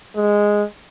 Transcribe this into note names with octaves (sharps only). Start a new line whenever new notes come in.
G#3